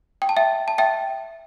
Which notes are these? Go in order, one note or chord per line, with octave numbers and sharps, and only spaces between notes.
G5
A5
E5 G5
A5
E5 G5